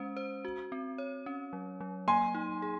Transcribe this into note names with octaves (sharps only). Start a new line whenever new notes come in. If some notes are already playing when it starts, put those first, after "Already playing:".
Already playing: G#3 C#4 C5
C5
F#4
C4
C#5
C#4
F#3
F#3
A#3 G#5 C6
D#4
G#4